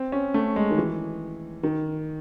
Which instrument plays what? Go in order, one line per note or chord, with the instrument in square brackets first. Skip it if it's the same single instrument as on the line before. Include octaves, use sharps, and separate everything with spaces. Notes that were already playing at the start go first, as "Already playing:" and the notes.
Already playing: [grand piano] C4
C#4
A3
G#3
D#3
E3
D#3